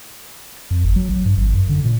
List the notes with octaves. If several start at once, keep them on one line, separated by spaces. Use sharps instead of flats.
F2
G1
F#3
A#1
G2
G#1
F#2
D3
A#2